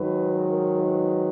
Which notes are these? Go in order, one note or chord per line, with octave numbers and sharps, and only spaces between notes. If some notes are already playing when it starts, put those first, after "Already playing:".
Already playing: G#2 D#3 F#3 B4
A#4
B4